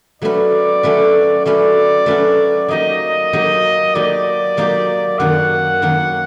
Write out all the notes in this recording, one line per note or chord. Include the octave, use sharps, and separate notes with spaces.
F#3 A3 C#4 F#4 B4 D5
F#3 A3 C#4 F#4 B4
F#3 A3 C#4 F#4 B4 D5
F#3 A3 C#4 F#4 B4
F#3 A#3 D#4 G4 D#5
F#3 A#3 D#4 G4
F#3 A#3 D#4 G4 D5
F#3 A#3 D#4 G4
F#2 D#3 F#3 A#3 F#5
F#2 D#3 F#3 A#3